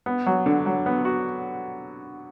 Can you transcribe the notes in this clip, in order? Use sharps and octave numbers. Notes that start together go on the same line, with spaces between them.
B3
F#3
D3
F#3
B3
F#4